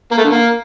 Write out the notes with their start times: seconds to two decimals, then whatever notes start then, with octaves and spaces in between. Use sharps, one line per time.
0.11 A#3
0.18 A3
0.24 D3
0.30 A#3